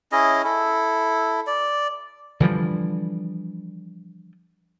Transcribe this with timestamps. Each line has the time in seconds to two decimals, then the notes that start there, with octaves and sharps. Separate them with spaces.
0.12 C#4 E4 G#4 D#5
0.45 E4 A4
1.47 D5
2.40 D3 E3 F3 G3